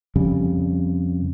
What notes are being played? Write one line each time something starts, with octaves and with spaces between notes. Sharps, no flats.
F2 C#3 G3